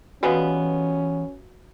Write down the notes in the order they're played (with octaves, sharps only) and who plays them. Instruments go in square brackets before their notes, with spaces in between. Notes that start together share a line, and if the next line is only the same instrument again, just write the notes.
[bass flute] E3 [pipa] G3 G#3 B3 [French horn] C#4 [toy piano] F#4 B4 F5